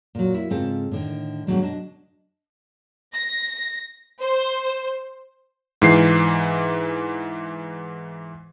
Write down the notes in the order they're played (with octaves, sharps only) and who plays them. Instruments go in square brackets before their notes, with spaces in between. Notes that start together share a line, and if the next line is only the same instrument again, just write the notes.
[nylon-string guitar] A#2 F#3
A#3 E4
G#2 C#3 C4 F4 A4
A2 D3 D#3
G#2 B2 D3 F#3 G3 A3
D4 D#5 A5
[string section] A#6
C5
[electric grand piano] G#2 E3 C7